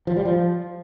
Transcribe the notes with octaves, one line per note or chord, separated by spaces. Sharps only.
F3
G3
F3